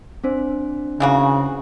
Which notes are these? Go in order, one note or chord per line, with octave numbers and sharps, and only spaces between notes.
C4 D4 C5
C#3 E3 A#3 F#4